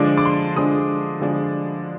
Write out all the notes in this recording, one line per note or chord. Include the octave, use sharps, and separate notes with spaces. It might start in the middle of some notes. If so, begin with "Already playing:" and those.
Already playing: D3 F3 G#3 D4 D6
D6
C6
D3 F3 G#3 D4 D#6
D3 F3 G#3 D4